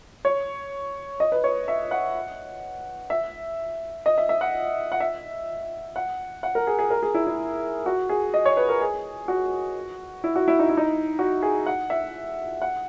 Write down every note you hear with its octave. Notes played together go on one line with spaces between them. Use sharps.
C#5
D#5
B4
C#5
E5
F#5
E5
D#5
E5
E5
F#5
F#5
E5
F#5
F#5
A#4
G#4
G#4
A#4
G#4
E4
E4
F#4
G#4
D#5
C#5
B4
A#4
G#4
F#4
E4
F#4
E4
D#4
E4
D#4
F#4
G#4
F#5
E5
F#5